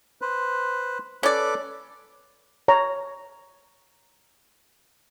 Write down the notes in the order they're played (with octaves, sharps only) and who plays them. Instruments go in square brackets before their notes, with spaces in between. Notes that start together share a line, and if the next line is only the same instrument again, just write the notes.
[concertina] B4 C5
[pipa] C#4 D5 [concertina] A4 B4 D6
[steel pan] C#5 A#5